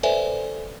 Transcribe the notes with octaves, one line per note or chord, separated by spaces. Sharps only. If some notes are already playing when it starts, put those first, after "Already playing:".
A4 B4 C5 D5 E5 G#5